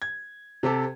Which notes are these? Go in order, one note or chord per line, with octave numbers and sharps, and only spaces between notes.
G#6
C3 C4 G4 A4